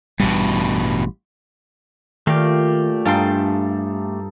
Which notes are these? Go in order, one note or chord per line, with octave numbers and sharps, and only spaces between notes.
A1 G2 B2 G3
A#2 D#3 A3 G4 F5 A#6
G2 D#4 A4 F5 G5 G#5 C6 A6